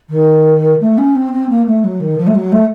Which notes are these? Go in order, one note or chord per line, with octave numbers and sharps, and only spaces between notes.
D#3
A3
C#4
C4
C4
A#3
A3
F#3
D#3
F3
A3
F#3
A3